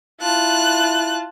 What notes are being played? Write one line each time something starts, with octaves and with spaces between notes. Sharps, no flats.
E4 F4 A5 F#6